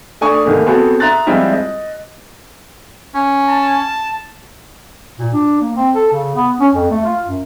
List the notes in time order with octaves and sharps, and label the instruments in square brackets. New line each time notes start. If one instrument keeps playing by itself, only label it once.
[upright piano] A3 D4 G#5 C#6 D#6
C2 D#3 E3 A3 A#3
B3 C4 F#4 G#4 A4
E5 A#5 C6 F#6 A6
F3 G3 G#3 C4 E4 F4
D#5
[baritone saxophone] C#4
[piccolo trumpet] A5
[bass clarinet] A#2
D4
A#3
C4
A4
C#3
B3
C#4
F2
A3
F4
F#2